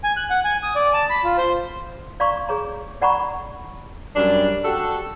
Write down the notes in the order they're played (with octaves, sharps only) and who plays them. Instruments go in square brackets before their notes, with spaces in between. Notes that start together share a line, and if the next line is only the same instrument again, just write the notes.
[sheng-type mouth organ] G#5
F#6
F#5
G#5
D#6
D5
A5
B5
F4
C5
[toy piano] D5 F5 A#5 C6 C#6
G#4 C#5 A#5
D5 F#5 A#5 B5 C#6
[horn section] F#2 G3 D4
F#4 G4 A4